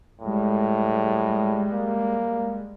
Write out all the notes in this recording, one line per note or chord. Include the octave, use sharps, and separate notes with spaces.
A2 G3 G#3
A#3